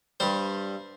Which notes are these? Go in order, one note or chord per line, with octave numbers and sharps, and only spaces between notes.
G2 G3 C5